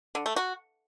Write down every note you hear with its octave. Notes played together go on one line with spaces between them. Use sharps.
D3
A3
F#4